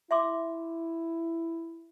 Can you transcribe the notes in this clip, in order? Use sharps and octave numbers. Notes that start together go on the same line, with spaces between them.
E4 E5 C6 D6